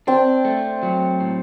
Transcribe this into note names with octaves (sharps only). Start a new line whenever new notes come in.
C4 D4
A3
F#3
A2